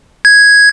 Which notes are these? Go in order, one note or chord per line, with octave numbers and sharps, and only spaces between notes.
G#6